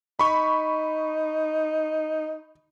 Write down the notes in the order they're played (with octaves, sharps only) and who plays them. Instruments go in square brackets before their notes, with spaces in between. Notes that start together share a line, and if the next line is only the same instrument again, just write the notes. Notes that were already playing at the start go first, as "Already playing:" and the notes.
[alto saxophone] D#4 [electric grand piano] B5 C#6